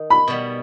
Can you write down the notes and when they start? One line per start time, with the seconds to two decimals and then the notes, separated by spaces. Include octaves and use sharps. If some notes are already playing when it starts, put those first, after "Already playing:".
Already playing: D#3
0.10 B5
0.27 B2 G3 B3